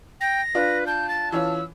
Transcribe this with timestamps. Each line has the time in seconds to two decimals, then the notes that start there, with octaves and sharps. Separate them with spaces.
0.21 G5 A#6
0.55 D4 F4 B4
0.87 A5 G6
1.09 A6
1.32 E3 C#4 F4 E6